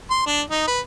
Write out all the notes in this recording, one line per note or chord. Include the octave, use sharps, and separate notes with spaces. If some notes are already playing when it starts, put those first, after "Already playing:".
C6
D4
D#4
B4